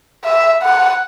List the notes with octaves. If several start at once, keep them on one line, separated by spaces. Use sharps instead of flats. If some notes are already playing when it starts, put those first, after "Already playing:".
E5
F#5